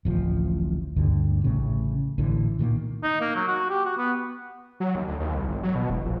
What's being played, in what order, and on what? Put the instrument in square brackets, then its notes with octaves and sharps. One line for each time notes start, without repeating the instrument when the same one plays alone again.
[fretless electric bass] D1 A1 F3
D2 G2 D3
A1 A2 C#3
A1 A2 D3 E3
A#2 D#3 F#3 A#3
[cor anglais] D#4
A#3
F#3
F#4
G4
F#4
B3
[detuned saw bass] F#3
D#2
D2
D#2
C2
G#1
F#3
B2
E1
A#1